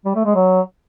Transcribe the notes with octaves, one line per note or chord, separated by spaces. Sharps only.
G3
A3
G#3
F#3